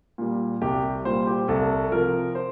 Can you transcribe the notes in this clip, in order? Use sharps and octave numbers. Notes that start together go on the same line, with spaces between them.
A#2 G3
C2 G4
A#2 G3 C5
G4
C2 A4
C3 F3 A#4
C5